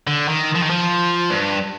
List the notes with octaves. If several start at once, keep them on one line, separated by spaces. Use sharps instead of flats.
D3
D#3
F3
D#3
F3
G2